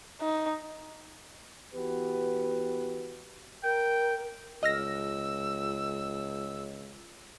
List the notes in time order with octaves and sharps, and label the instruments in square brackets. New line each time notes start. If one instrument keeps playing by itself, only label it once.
[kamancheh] D#4
[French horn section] E3 B3 F#4 G4 B4
[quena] A#4 [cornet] G5
[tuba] C#2 [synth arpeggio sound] D#5 F6 A#6 [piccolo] E6